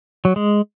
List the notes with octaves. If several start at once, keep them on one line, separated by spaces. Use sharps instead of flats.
F#3
G#3